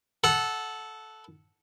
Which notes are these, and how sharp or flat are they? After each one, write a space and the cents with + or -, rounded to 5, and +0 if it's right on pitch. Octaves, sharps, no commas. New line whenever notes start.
A4 -10 F#5 +0